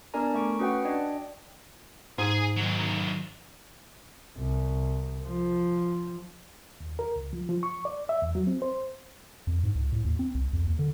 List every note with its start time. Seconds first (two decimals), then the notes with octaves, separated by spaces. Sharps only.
0.14 B3 D4 A#4 D5 G#5 A#5
0.34 A3 C#6 D7
0.59 C#4 F#4 B4 F#5 G5
0.85 D4 D5 D#5 G5
2.18 G#2 G#4 G#5
2.56 D#3 F#3
4.38 C2
5.27 F3
6.81 D#2
6.99 A#4
7.16 C#2
7.33 F3
7.49 F3
7.63 C#6
7.85 D5
8.09 E5
8.22 E2
8.35 F#3
8.47 C4
8.62 C5
9.47 F2
9.63 G#2
9.75 C#2
9.92 A2
10.05 D#2
10.19 C4
10.35 C2
10.53 F2
10.67 D#2
10.79 D3